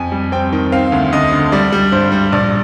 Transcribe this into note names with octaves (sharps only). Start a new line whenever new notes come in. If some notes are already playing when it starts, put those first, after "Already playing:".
Already playing: F2 G#5
G3
C4 G5
D#3
C4 F5
D2
D2 D#5
D3
G3 D5
G3
G2 C5
G3
A#1 D5